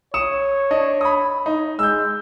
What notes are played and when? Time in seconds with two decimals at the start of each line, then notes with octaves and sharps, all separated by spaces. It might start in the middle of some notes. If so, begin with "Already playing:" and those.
0.14 C#5 D#6 C#7 E7
0.71 D4 D#5
1.01 B5 D#6
1.46 D#4
1.79 G#3 E6 G6